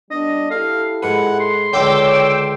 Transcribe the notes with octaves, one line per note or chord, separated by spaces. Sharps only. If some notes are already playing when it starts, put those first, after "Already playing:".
G3 B3 D4 D#5
E4 G4 A4 F5
G#2 B4 F#5
C6
C#2 D3 C#5 G5 D6 E6